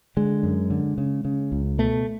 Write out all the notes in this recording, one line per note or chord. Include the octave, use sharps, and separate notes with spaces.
D3 G#3
F#2
D3
C#3
C#3
C#2
B2 A3